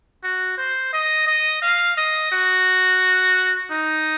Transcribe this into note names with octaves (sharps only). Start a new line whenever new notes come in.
F#4
C5
D#5
D#5
F5
D#5
F#4
D#4